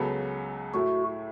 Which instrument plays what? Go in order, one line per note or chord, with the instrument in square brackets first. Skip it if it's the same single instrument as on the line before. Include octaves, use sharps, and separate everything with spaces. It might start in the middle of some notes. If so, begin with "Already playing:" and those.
Already playing: [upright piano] C#2 C#3 F#3 B3 A4
[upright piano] A2 A3 E4 [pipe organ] F#4